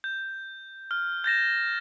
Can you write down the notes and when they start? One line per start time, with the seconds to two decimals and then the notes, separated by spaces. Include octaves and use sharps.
0.04 G6
0.91 F6
1.24 G6 A6 A#6 E7